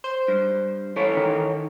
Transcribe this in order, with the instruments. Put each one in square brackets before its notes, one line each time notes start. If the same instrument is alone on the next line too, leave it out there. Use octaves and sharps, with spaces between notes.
[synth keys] C5
[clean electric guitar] G2
E3 A4 C#5
[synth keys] D#3